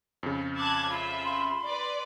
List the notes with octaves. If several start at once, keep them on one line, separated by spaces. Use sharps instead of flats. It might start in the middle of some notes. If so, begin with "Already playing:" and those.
F2 C#3
A5 D6 F#6 G#6
F4 E5 B5
C6
B4 D5